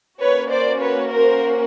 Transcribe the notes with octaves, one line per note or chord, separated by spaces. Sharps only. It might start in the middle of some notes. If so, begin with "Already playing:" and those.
A#3 C#4 F#4 B4 C#5
C5 D5
B4 C#5
A#4 C5